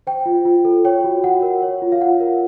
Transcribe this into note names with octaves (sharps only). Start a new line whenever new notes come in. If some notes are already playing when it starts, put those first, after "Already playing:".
C5 G5
F4
F4
A4
C#5 G5
F#4
F#4 F#5
A#4
C#5
F4
F5
F4 F#5
A#4